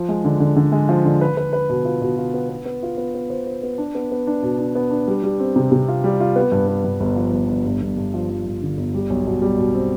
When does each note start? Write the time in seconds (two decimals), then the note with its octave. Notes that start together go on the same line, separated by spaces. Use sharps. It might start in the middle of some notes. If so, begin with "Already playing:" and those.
Already playing: F3
0.09 G#3
0.25 D3
0.40 D3
0.56 D3
0.72 G#3
0.89 F3
1.05 D3
1.21 B4
1.37 B4
1.53 B4
1.69 B2
1.85 F4
2.01 B2
2.18 F4
2.34 B3
2.49 B3
2.65 B3
2.83 F4
2.97 B3
3.14 B3
3.30 C5
3.47 C5
3.63 B3
3.78 D4
3.95 B3
4.11 B3
4.27 D4
4.43 B2
4.59 D4
4.75 B3
4.91 D4
5.08 G3
5.23 G3
5.40 C4
5.56 C3
5.72 C3
5.88 F4
6.04 G3
6.20 F4
6.36 B3
6.52 G2
6.68 B3
6.85 G2
7.00 G1
7.16 F3
7.33 G1
7.49 G1
7.65 G2
7.81 G1
7.97 G2
8.14 F3
8.29 F3
8.46 G2
8.62 D3
8.77 G1
8.94 G3
9.10 B1
9.27 B2
9.42 G3
9.58 B2
9.74 C4